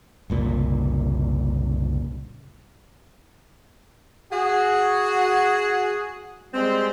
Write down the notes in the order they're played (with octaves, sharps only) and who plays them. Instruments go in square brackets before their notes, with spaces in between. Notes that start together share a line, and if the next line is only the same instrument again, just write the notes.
[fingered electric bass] F#1 C2 A#2
[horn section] F#4 G#4
G3 G#3 C4